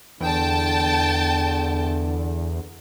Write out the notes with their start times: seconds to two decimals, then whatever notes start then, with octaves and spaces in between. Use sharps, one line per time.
0.21 E2 D3 G5 A5